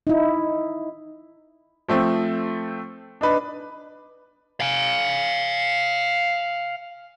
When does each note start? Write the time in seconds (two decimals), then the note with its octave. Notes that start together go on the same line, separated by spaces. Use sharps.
0.07 D#4 E4
1.88 F3 A3 C4
3.21 D4 D#4 B4
4.60 F5 G#5